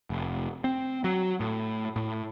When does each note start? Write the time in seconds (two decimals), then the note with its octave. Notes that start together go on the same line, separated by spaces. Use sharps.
0.10 F1
0.64 C4
1.04 F#3
1.40 A2
1.96 A2